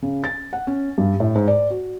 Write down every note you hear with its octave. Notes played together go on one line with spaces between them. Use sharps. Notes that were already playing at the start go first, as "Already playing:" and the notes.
C#3
A6
F#5
C#4
G2
A2
G#2
D5
F#4